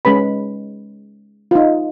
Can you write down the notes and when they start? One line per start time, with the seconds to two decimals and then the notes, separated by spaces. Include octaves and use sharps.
0.05 G#3 C#4 B4 B5
1.51 D#4 F4